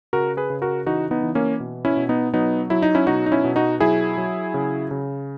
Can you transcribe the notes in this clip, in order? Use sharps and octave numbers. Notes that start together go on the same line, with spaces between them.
C#3 F#4 A#4
G#4 B4
C#3
F#4 A#4
E3 D#4 F#4
B3 D#4
E3
A#3 C#4
B2
C#4 E4
B2
B3 D#4
F#3 B3 D#4
F#3 E4
D#4
C#4 E4
B2 D#4 F#4
D#4
C#4 E4
B2
D#4 F#4
F#3 E4 G#4
F#3
C#3
C#3